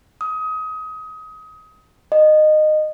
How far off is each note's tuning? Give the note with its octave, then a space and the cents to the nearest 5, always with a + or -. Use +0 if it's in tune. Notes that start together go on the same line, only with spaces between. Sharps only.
D#6 +25
D#5 -20